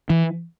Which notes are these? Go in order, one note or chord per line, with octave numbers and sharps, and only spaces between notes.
E3